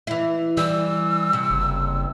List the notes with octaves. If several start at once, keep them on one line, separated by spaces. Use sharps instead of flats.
E3 E4
E3 G3 E6
C3
F#1